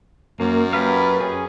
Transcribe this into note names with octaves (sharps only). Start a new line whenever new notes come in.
F#2 A#3
G4 B4 F5
C#4 G#4